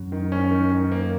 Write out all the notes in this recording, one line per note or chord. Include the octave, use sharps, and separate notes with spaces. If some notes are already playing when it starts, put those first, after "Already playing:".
Already playing: F#2
D#3
C#4
D#3
D#3
A#3